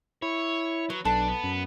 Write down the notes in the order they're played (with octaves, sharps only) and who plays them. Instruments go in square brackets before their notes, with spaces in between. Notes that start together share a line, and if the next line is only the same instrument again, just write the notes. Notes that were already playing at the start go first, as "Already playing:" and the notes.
[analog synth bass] E4 [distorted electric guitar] C#5
[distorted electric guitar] F#3 [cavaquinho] B4
[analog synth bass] B1 [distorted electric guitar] D4 [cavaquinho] A4 B4 B5
[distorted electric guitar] B3
[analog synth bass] F#2